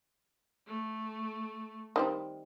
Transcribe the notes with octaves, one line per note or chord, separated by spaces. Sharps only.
A3
D#3 G3 C4